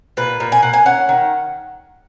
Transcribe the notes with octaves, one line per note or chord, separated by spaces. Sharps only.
A#2 B4
A#2
G#5
A#3 F#5
G#5
C#4 F#5
D#3